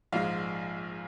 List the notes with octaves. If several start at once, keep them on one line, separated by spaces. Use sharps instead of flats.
A#1 G#2 F3 G#3 F5